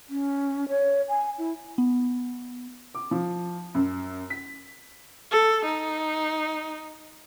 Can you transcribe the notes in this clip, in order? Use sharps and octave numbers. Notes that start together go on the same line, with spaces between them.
C#4
C#5
G#5
E4
B3
D6
F3
F#2
B6
A4
D#4